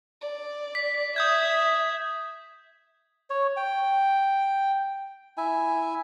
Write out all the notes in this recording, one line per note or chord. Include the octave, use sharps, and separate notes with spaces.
D5
B6
E5 D#6 G6 G#6
C#5
G5
E4 E5 G#5